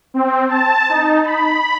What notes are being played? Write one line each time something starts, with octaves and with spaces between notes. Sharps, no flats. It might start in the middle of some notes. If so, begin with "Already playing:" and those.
C4
A5
D#4
B5